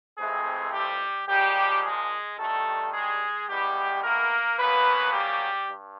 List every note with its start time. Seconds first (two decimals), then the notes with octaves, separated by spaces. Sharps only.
0.17 F2 C3 E3 G#3 A3 C4 G#4
0.72 G3 G4
1.27 A#2 F3 G3 G#3 G4
1.82 G#3 G#4
2.37 G2 D#3 G3 A3 A4
2.93 G#3 G#4
3.48 A2 E3 G3 G#3 B3 G4
4.03 A#3 A#4
4.58 C#3 F#3 A#3 B3 B4
5.13 G3 G4
5.68 G2